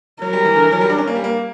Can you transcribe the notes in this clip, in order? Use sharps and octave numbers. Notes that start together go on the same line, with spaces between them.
F#3 A#4
G3
E3
D3
E3
F#3
G3
D4
C#4
A#3
G3
A#3